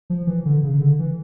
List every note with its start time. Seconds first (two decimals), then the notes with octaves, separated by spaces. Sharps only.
0.10 F3
0.27 E3
0.45 D3
0.63 C#3
0.81 D3
0.99 E3